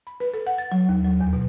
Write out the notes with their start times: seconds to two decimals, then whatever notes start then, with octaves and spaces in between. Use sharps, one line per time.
0.07 B5
0.20 B4
0.34 A4
0.47 F#5
0.58 A6
0.72 F#3
0.89 D#2
1.05 F#3
1.21 E2
1.33 B2